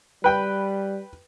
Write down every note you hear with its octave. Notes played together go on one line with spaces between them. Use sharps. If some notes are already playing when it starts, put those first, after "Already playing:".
G3 B4 G5 B5